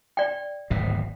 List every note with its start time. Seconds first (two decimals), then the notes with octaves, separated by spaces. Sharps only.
0.17 D5 G5
0.70 D1 G#1 B2